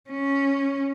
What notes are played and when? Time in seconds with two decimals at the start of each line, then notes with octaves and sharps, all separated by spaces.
0.10 C#4